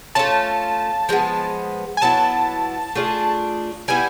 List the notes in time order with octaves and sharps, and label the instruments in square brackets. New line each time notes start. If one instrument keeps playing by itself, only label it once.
[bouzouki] A3 C#4 F4 [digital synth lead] A5
[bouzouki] F3 G#3 B3
[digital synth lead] G#5
[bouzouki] F#3 B3 E4 [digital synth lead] A5
[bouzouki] A3 D4 F4 G#4
[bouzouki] G3 B3 E4 [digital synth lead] G#5